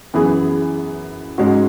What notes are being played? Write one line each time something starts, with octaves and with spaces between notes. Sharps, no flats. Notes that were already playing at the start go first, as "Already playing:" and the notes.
F#2 E3 B3 G#4
G#2 G#3 C#4 F#4